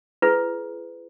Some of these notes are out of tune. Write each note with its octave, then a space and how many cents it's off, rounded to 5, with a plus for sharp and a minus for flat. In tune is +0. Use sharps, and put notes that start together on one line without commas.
F4 -45 G#4 +35 B4 +30